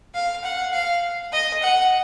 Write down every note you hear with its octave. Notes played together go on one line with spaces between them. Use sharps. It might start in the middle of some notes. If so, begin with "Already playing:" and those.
F5
F#5
F5
D#5
F#5